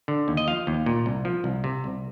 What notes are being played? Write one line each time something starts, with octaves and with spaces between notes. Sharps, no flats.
D3
D#2
D#5
F3 F5
D#2
A#2
C2
F3
C2
C3
C2